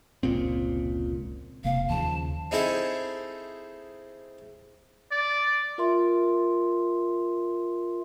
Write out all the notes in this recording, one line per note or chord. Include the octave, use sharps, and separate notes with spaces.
F1 C#2 A#2 C4
E1 C3 A#3 F5
D#2 C#3 F3 A5
C4 D#4 E4 G#4 A4 C5
D5
F4 A#4 E5 C6